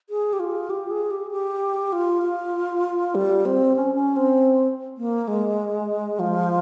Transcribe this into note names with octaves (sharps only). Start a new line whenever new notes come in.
G#4
G4
F4
G4
G#4
G4
G4
F4
F4
G3
C4
C#4
C#4
C4
A#3
G#3
F3